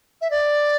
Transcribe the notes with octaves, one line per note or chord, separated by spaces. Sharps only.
E5
D5